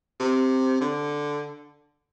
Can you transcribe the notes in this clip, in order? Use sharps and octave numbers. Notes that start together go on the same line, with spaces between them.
C3
D3